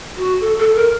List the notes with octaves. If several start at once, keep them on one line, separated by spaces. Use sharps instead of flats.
F#4
A4
A4
A#4